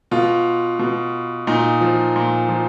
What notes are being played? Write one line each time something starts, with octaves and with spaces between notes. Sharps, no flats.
B2 F4
B2
A#2 D#4
F3
A#2
F3